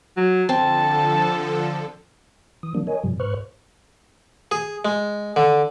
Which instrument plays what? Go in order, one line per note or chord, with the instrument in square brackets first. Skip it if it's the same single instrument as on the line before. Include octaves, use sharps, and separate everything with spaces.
[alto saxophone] F#3
[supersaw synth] D3 F3 A4 [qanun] C4 [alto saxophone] A5
[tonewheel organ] E3 D#6
D#3 F3 G3 A#3 D4
A#4 C#5 D#5 G#5
G2 C3 F3 G3
G#2 B4 C5 C#6 F6 F#6
[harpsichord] G#4
G#3
D3